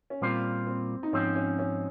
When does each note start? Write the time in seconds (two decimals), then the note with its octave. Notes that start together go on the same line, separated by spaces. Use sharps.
0.10 C#4
0.21 A#2 G3 A#3 C4 F4
0.67 C4
1.03 D#4
1.13 G#2 F3 C4 C#4
1.35 C#4
1.59 C#4